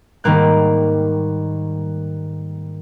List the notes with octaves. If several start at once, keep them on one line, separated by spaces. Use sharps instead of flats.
G#2 D#3 G3 A#3 F#6